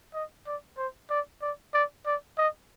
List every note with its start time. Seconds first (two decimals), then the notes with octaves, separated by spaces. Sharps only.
0.14 D#5
0.46 D5
0.77 C5
1.10 D5
1.42 D5
1.74 D5
2.06 D5
2.38 D#5